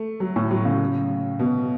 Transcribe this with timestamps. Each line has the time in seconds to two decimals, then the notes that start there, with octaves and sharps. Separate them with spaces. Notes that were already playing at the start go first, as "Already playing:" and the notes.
Already playing: A3
0.20 F#3
0.36 A2
0.51 F#3
0.65 C#3
1.39 B2